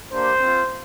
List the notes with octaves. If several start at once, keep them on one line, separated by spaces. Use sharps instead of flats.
A#3 D4 G4 C5
C4 F4